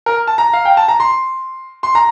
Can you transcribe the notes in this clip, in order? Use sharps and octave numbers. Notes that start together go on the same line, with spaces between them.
A#4
A5
A#5
F5
G5
A5
A#5
C6
C6
A#5